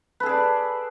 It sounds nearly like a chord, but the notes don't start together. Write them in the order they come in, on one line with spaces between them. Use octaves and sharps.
B4 A4 G#4 D5